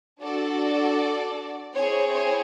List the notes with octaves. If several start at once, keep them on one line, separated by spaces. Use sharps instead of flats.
D4 F#4 A4 D5
C4 E4 G#4 C#5
C#5